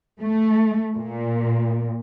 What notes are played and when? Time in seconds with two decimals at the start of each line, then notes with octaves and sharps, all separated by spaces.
0.21 A3
0.95 A#2